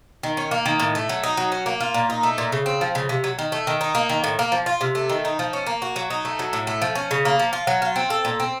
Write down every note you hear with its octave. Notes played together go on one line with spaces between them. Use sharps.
D#3
C#4
A#3
D#3
A2
A3
F#3
D#4
F#3
C#4
A#3
F4
A#2
D#4
A3
A#2
C#3
C4
F3
C#3
C3
F#3
D#3
A3
D#3
D#4
A#3
D#3
A2
A#3
F3
F4
C3
A3
D#3
D#4
F3
C#4
A#3
F#4
F#3
D#4
A3
F#3
A2
A3
F3
C#4
C#3
A#3
F3
F4
F#3
F4
C4
A4
A#2
C4